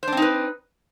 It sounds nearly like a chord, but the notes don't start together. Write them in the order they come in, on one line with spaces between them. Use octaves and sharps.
C5 D4 C4 D#4 B4